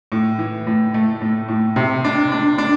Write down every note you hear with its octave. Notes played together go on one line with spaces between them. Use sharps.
A2
E3
A2
A3
A2
A2
C3
D4
D4
D4